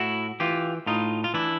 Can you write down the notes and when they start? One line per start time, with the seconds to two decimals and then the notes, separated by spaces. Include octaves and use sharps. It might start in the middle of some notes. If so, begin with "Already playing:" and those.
Already playing: A2 E4 F#4
0.40 E3 F4 G4
0.86 A2 D#4 F4
1.24 F4
1.34 E3 D4 E4